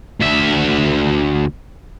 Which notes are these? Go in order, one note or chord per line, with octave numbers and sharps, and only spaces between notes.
D2 E5